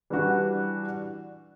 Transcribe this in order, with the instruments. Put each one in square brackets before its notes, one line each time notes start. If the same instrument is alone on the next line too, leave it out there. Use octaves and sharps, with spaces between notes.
[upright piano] E3 G3 D4 F#4